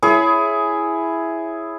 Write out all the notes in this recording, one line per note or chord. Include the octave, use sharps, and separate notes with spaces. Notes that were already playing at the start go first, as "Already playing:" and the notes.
E4 G#4 C#5